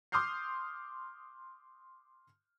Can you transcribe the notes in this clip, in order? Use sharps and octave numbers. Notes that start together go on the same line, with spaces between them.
C6 D6 D#6 F6 G6 C7